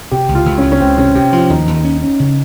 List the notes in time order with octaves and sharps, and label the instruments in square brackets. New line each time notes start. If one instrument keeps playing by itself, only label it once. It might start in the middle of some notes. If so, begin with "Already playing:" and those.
[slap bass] C3 [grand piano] G4
[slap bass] C#2
[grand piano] F4
[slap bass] C#2
[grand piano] C#4
[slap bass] C#2
[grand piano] C#4
[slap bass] C#2 [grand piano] C4
[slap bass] C3 [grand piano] C#4
[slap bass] C3 [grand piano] G4
[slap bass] F3 [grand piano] F4
[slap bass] D#2 [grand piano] D#4
[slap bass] D#2
C#4
C#4
C#3